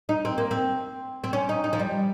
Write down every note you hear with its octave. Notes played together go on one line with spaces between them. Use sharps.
D#4
C4
A#3
C4
C4
C#4
D#4
D#4
F3
G3